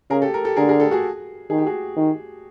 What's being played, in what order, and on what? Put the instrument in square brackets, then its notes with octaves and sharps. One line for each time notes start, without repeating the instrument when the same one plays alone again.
[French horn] C#3 [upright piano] G#4 A#4
[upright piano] G4 A4
A#4
G4 A4
[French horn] D3 [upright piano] G#4 A#4
[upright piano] G#4 A#4
G4 A4
F#4 G#4
[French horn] D#3 [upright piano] G#4
[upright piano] G4
F#4 G#4
[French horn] D#3